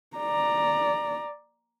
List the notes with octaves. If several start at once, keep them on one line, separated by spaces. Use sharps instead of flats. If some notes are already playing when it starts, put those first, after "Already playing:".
D5 A#5